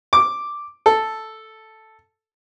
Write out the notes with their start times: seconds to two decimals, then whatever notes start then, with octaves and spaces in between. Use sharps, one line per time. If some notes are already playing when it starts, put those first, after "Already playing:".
0.13 D6
0.86 A4